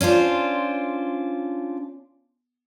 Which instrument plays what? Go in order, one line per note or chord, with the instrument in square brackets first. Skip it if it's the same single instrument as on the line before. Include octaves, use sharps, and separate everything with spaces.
[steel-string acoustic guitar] C#4 D4 F4 C5